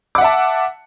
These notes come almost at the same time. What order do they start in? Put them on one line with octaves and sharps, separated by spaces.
D6 F#5 E5 A5